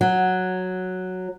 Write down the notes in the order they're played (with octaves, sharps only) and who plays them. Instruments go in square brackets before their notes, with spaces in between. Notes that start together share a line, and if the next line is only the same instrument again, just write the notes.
[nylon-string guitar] F#3